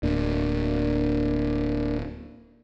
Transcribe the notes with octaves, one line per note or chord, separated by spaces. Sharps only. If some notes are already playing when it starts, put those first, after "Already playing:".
D1 A#3 D4